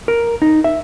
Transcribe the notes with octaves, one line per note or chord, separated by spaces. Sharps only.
A#4
D#4
E5